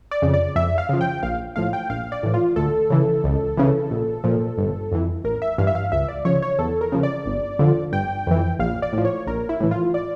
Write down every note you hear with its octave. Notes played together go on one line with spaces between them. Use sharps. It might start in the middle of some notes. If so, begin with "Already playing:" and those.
D5
F2 C#3
D5
F2 E5
F5
C#3 F3
G5
A#1 F5
A2 F3 F5
G5
A#1 F5
D5
A2 E3
F4
D2 A4
C#3 E3
C#2
C#3 E3
A#1
A#2 F3
G1
F2 E3
A1 A#4
E5
G2 E3 F5
E5
F5
C#2 E5
D5
C#3 F3 C#5
C#5
E2 A4
A#4
C#3 F3
D5
G1
F2 D3 F3
G1 G5
F2 E3
A#1 F5
D5
A2 F3
C#5
A#1 A#4
E4
A2 E3
F4
D5